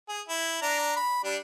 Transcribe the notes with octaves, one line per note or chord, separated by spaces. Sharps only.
G#4
E4
D4 A#5
B5
G3 D4